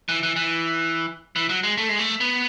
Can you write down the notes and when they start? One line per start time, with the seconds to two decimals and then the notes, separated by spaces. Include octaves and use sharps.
0.09 E3
0.23 E3
0.36 E3
1.36 E3
1.49 F#3
1.63 G#3
1.77 A3
1.89 G#3
1.99 A3
2.20 B3